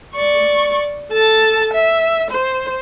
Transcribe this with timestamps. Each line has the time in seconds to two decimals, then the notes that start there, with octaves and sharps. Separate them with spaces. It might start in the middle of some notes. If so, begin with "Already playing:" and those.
0.14 D5 C#6
1.11 A4 A5
1.74 E5
2.31 C5